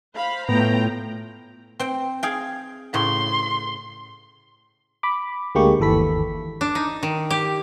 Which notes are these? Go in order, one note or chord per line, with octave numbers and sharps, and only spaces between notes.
C5 F5 B5
A2 B3 F4 G5 A#5
C4 G5
G#4 F5 G5
A2 C#3 C6
B5 D6
D2 D3 G#3 A#3 G4 C#6
G1 D#2 E3 A4 B5 B6
D4
D#4
D#3
G4